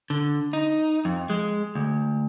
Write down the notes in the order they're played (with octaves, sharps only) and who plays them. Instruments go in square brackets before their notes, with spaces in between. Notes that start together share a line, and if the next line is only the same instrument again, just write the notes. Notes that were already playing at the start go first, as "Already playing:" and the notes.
[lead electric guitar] D3
D#4
F2
G#3
D2